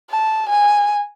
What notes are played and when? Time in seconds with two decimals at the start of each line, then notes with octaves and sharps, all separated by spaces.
0.10 A5
0.50 G#5